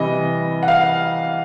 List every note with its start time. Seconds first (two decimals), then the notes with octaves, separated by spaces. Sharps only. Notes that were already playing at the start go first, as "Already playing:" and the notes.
Already playing: C3 E3 G3 D#5
0.63 F#5
0.68 F5